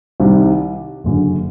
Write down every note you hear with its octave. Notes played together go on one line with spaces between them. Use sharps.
C2 C3 D#3 G3
F#1 F#2 D3